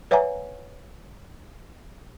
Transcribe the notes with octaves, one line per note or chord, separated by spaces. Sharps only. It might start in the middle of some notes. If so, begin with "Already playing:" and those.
B4 C#5 E5 F#5 G#5 A#5